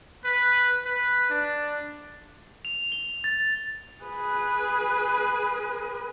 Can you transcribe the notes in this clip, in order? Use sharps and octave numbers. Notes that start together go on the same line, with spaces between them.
B4
B4
D4
F7
G7
A6
G#4 B4